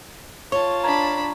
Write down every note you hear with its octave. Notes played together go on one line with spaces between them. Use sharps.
F4 C#5 A5 C#6
D4 A#5 B5 G#6